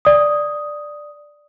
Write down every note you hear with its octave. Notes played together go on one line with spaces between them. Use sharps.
D5 D#6